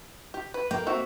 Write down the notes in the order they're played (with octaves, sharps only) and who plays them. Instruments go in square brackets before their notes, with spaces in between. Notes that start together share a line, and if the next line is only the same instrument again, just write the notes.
[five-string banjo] G4
B4
[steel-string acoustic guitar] A#3 [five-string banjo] G5
[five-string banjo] C4 F#4 E5